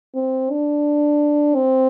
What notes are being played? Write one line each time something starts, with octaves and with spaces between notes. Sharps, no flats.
C4
D4
C4